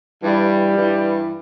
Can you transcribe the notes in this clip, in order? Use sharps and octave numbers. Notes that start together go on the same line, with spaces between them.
G2 E3 G3
G2 E3